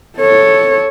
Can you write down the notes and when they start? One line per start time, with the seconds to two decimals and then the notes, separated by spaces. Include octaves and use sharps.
0.18 A4 C#5